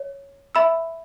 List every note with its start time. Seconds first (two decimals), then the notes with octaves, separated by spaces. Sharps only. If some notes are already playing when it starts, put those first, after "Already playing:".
Already playing: C#5
0.55 E5 B5 E6